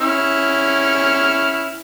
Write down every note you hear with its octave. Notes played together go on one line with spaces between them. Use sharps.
C#4 E4 F6